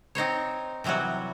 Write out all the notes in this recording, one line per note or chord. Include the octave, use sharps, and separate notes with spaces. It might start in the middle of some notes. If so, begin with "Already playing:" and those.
C4 D#4 C5 C#5
C3 E3 F#3 G3 F#4